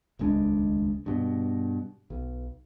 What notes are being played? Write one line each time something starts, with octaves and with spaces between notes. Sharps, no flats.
D#1 C#2 G#3 D4
G2 B2
B1